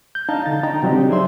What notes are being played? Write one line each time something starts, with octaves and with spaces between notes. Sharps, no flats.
G6
D4 D#4 F5 A5 A#5
D3 A6
D#4 G5 A#5
C#3 F#3 C4 D4 D#4 G4
G#4 C5 D5 E5 C6